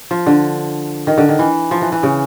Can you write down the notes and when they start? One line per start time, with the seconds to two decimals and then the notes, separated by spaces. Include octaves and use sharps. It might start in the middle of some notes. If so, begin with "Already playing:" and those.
0.11 F3
0.27 D3
1.07 D#3
1.18 D3
1.29 D#3
1.39 E3
1.71 F3
1.82 E3
1.92 E3
2.03 C#3